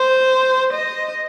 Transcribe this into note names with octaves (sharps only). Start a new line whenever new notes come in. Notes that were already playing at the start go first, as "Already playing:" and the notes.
Already playing: C5
D#5